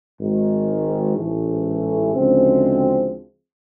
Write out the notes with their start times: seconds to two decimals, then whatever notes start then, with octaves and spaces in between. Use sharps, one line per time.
0.19 G#1 G#2 D#3
1.16 A1 G#2 E3 A3
2.14 D2 C#3 F3 G#3 C4